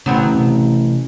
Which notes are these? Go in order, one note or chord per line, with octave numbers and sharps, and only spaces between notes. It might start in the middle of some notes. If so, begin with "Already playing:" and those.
A1 C#3 F#3 B3 C4
C3